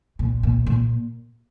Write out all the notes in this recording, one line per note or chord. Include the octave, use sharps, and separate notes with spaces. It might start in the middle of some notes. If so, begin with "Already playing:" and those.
A#2
A#2
A#2